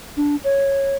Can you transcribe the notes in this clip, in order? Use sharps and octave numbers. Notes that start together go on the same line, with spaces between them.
D4
C#5